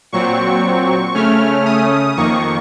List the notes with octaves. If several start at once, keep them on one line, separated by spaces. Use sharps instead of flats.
A#2 F#3 C4 C#6
C#3 A3 C#4 F6
D#6
F2 D#3 A#3 C#6